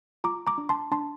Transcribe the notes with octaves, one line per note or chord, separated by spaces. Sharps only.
F4 A#5 D6
A#5 D6
D4
A5 C6
D4 A5 C6